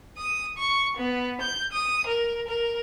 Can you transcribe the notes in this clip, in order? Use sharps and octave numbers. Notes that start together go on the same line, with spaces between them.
D#6
C#6
B3
G6
D#6
A#4
A#4